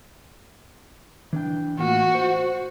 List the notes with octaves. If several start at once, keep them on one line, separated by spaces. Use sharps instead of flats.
E3 D4 G5
A2 A#3 F4 F#4
C5